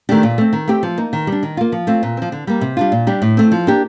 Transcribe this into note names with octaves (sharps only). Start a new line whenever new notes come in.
D#3 A3 D4 G4
A#2
A3 C4
D#3
A3 C4 G4
F3
A#3 D#4
D#3
G3
D4
D#3
A#3 F4
F3
A3 C4 F4
A#2
F3 C4
D3
G3 A#3
C3
G3 D4 F4
A#2
G3 D4 G4
A2
A3 C4
F3
A#3 D4 G4